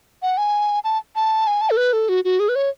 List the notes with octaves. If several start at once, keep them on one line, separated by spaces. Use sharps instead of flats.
F#5
G#5
A5
A5
G#5
A5
A4
B4
A4
F#4
F#4
G#4
B4
C#5